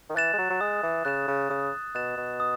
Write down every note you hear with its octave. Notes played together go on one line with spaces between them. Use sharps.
D#3
E3 F#6 A6 E7
G#3
F#3
F#3
G#3 D#6
E3
C#3 F#6 A6 E7
C#3
C#3 D#6
B2 F#6 A6 E7
B2
D#6